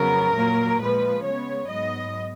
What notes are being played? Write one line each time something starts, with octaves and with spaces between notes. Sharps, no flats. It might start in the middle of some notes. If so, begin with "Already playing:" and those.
Already playing: F2 C#3 F#3 B3 A#4
A#2 F#3 A#3
A#2 F3 G#3 B4
C#3 G#3 B3 C#5
G#2 F#3 B3 D#5